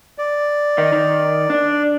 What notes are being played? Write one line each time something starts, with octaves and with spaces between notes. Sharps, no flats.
D5
D#3 D#4
D#3
D4